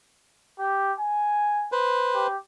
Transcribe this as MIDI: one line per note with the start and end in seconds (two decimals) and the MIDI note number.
0.59 0.92 67
0.99 1.70 80
1.72 2.27 71
1.72 2.27 72
2.14 2.36 67